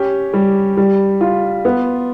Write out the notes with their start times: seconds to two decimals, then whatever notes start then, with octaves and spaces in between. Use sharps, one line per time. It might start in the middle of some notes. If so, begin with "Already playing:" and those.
Already playing: C#4 G4
0.33 G3
0.77 G3
1.21 F4
1.65 B3